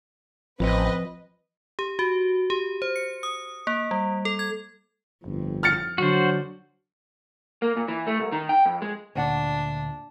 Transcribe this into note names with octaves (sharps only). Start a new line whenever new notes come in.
A1 F3 C4 B4 D#5
G4
F#4
G4
C5
C#7
D#6
A#3
G3
A4
G#6
G1 F2
F6 A6 C#7
D3 F#3 D4 F#4 C5
A#3
A#2
E3
A3
C2
D#3
G5
F2
G#3
D2 A#2 D4 F#5